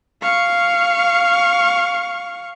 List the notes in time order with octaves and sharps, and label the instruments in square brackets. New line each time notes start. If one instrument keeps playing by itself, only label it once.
[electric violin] F5 C#6